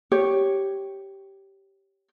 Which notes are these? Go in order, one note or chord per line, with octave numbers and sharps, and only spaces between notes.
G4 C#5